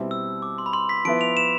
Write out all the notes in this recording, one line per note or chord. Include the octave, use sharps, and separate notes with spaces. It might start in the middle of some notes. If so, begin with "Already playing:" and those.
Already playing: B2 G3 C4 E4
E6
D6
C6
B5
C6
B6
F3 B3 E4 D7
F7
E7